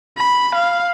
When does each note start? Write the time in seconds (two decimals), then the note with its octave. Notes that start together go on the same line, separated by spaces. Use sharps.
0.17 B5
0.55 F5